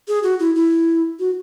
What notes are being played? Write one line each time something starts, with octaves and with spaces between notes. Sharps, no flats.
G#4
F#4
E4
E4
F#4